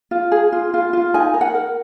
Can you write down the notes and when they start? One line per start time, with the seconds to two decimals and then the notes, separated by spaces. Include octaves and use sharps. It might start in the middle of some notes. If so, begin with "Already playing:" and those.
0.11 F4
0.32 G#4
0.52 F4
0.74 F4
0.93 F4
1.14 D#4 G#5
1.34 A#4
1.41 F#5
1.54 A#4